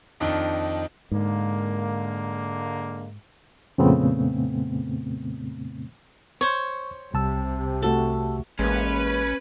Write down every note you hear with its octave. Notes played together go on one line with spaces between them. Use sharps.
F2 D#3 D4 D#4
G#2 D3 G#3 A#3
F2 A#2 C#3 A3 B3 C4
C5 C#5 C#6
C2 C3 A5 E6
A3 F#4 G4 A4
A1 G#3 A#3 C#4 B4